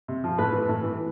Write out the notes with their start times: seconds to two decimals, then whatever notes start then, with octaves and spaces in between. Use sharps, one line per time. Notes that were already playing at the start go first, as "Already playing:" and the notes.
0.08 C3
0.24 F3
0.38 A2 B4
0.53 E3
0.68 A2
0.83 E3